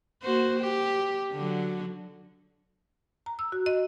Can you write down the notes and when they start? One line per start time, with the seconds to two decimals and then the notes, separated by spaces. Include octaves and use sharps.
0.23 A#3 F#4 C5
0.59 G4
1.32 D3 F#3
3.26 A#5
3.39 E6
3.52 F#4
3.66 D#5